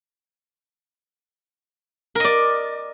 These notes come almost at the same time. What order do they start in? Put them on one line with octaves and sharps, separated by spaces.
A#4 D#5 D5